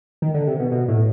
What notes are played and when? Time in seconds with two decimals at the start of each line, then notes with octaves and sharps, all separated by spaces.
0.22 D#3
0.34 D3
0.47 C3
0.60 B2
0.72 B2
0.88 A2